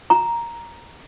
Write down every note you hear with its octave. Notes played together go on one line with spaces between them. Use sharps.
A#5